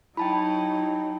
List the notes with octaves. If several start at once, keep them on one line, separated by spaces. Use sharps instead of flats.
F#3 D#4 E4 G5 A5 B5